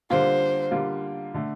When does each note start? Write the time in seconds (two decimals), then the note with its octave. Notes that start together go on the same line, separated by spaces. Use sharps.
0.10 D3 G3 A#3 F4 C5
0.71 D3 G3 A#3 F4
1.34 D3 A3